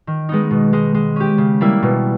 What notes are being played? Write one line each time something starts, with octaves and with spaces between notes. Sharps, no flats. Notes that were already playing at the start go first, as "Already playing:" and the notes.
D#3
G#3 B3 D#4
B2
G#3 D#4
G#3
C#4 G4
C#3
G3 A#3 E4
B2